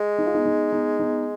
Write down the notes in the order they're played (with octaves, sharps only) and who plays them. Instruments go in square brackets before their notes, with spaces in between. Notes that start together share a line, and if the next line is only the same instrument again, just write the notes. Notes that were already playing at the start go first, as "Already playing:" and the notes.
Already playing: [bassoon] G#3
[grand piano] D#4
F4
B3 D#4
B3 D#4
B3 D#4
B3 D#4